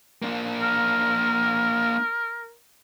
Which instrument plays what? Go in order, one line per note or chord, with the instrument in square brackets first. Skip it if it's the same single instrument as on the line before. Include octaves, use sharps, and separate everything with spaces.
[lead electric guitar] A#3 D4
[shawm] A#4